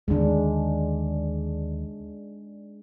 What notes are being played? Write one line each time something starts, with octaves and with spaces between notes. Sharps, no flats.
D#2 D3 D#3 G#3 D4